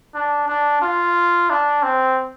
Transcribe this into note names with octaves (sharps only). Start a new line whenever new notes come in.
D4
D4
F4
D4
C4